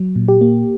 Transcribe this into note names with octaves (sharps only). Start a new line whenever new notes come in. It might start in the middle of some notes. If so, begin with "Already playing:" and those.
Already playing: F#3
A#2
G4
A#3